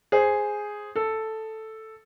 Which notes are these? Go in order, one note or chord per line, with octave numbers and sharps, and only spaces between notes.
G#4 C5
A4